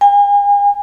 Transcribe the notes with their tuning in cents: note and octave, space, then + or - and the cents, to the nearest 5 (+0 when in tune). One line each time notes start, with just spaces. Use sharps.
G#5 -40